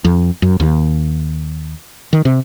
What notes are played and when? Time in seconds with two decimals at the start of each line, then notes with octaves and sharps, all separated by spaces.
0.05 F2
0.42 F#2
0.60 D#2
2.13 D#3
2.25 C3